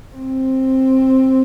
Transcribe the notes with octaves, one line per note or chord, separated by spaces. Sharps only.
C4